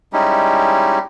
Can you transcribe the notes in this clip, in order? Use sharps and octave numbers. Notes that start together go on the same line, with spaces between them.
G3 G#3 C#4 D#4 E4 G4